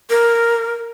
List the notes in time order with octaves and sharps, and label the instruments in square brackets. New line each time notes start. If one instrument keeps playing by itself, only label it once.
[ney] A#4